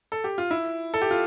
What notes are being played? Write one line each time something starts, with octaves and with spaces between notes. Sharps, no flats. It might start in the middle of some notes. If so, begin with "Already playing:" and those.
A4
G4
F4
E4
A4
G4
F4